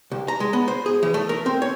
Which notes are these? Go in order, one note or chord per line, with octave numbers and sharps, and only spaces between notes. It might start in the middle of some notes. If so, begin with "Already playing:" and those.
C2
A#5
G#3
B3
C5
G#4
E3
A3
A#4
C4
C#5